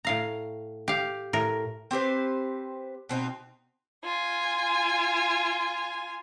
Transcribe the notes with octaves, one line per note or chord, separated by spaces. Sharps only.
A2 F5 A#5
G4 F5
A2 A#4
C4 G4 B4 C5
B2 C4 D#4
F4 G#5